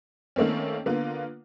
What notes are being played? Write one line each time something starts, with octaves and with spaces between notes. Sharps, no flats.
D#3 A3 A#3 C4 C#4
D3 A#3 B3 F4